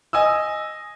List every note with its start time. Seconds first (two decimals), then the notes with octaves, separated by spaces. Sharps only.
0.13 D#5 G#5 D#6 E6